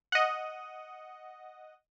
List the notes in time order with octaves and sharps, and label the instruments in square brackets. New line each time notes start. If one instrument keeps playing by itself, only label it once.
[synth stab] D#5 F#5